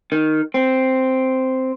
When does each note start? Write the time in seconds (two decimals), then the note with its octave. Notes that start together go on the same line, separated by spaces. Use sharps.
0.12 D#3
0.54 C4